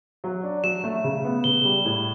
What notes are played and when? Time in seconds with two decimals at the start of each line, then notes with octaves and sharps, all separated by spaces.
0.24 F#3
0.43 D4
0.64 F#3 E7
0.84 A3
1.04 C#3
1.24 B3
1.44 C#3 G7
1.64 G3
1.85 A2